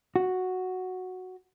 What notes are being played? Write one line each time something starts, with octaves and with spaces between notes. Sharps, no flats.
F#4